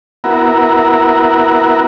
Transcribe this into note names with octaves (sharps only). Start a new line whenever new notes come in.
B3 E4 F#4 A#4